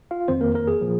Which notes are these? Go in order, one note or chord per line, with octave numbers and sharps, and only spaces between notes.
F4 F5
F2 D#3 C4 C5
A#3 A#4
A#3 A#4
G#4
A#2 F3